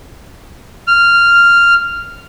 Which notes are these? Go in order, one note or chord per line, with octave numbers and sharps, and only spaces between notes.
F6